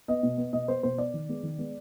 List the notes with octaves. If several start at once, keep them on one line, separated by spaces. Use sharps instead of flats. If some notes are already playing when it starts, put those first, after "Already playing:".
B3 D#5
B2
B3
B2 D#5
B3 C5
B2 C5
B3 D5
D#3
G#3 B3
D#3
G#3 B3